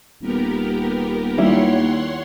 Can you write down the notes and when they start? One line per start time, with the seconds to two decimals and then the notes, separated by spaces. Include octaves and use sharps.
0.22 D#1 B3 G4 A#4
1.38 D#2 G3 E4 F4 C#5 F#5 C6